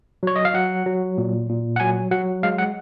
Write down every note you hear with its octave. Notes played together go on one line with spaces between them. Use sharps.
F#3 C#5
D#5
F5
F#3 F#5
F#3
A#2
A#2
F#5
F#3 G#5
F#3 F#5
G#3 F5
F#5